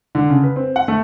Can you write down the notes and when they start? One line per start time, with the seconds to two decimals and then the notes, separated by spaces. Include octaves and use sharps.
0.15 D3
0.30 C#3
0.44 B4
0.56 C4
0.76 F#5
0.88 A3